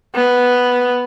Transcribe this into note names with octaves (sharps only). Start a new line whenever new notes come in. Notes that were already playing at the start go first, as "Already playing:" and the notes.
B3